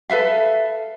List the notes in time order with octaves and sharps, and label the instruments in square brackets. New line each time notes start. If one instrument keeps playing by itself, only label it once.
[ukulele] A4 B4 E5 F5